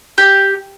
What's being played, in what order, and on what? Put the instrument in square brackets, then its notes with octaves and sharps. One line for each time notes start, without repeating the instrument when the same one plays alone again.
[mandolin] G4